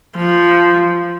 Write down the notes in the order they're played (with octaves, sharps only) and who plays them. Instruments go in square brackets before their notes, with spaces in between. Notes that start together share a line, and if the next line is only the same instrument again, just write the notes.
[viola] F3